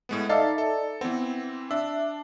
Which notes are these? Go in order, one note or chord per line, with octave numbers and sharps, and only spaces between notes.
A2 G#3 B3
D#4 A4 D5 E5 F5 A6
A4
E3 B3 C4
D4 E5